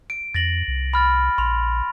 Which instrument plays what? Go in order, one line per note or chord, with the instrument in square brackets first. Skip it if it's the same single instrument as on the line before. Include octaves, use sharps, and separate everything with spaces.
[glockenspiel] D7
[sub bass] F2 [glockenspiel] A6 A#6 F#7
[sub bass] C2
[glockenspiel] B5 F6 A6
[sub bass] A#1 [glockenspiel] C6 F7